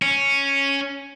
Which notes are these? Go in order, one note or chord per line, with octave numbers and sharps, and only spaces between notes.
C#4